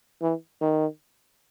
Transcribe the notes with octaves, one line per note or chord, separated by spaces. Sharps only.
E3
D#3